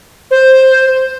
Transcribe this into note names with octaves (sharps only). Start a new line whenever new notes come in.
C5